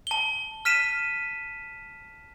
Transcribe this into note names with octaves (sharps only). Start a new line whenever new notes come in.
A5 G7
F6 B6 D#7 E7